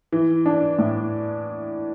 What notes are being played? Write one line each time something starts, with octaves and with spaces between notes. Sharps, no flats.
E3
D4
A2